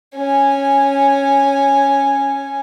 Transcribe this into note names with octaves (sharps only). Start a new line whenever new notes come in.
C#4 G#5